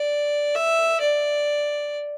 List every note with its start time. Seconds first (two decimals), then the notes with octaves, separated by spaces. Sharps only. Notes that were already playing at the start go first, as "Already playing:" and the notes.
Already playing: D5
0.55 E5
1.01 D5